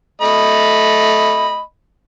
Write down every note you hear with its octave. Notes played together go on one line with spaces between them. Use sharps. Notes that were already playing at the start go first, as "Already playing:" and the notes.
A3 D#5 B5